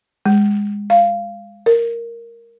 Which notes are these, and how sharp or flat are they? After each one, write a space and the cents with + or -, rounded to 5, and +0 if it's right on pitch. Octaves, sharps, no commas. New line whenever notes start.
G#3 -20
F5 -15
A#4 -5